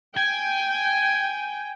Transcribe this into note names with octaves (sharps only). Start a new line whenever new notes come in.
G5 G#5